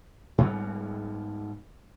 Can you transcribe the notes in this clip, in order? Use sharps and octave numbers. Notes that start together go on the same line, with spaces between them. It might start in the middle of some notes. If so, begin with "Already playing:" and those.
G#2 G3 B3